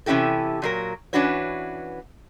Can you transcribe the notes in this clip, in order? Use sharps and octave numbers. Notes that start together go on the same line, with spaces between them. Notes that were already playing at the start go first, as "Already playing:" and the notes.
C3 E3 C#4 E4 G4 A4
A#2 F#3 A#4
E3 C#4 D4 F#4 B4 C#5